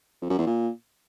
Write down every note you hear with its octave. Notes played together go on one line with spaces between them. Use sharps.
F2
F#2
E2
A#2